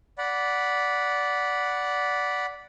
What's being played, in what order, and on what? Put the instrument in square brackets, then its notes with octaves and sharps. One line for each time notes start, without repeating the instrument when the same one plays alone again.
[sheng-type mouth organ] D5 F#5 B5